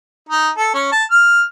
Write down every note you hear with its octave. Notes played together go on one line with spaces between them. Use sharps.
D#4
A4
C#4
A5
F6